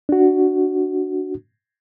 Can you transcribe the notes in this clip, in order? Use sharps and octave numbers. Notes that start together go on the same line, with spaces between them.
D4 F#4